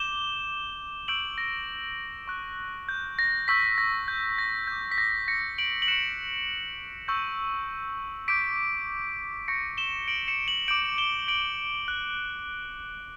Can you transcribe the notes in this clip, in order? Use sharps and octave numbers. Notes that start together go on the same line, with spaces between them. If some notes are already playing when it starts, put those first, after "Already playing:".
Already playing: D6 G6 E7 G7
C#6 E6 G6 D7 F#7
A#6
C#6 F#6
G6
A#6
C#6 E6 G6 B6
A#6
G6
A#6
D6 G6
B6
A#6
A#6 C#7
D7 F#7
F#7
C#6 F#6 C#7 E7
C#6 E6 G6
D6 G6 B6 D7
C#6 G6 A#6 C#7
E7 G7
D7 F#7
C#7 E7
D7 F#7
D6 G6 D7 F#7
E7 G7
D7 F#7
F#6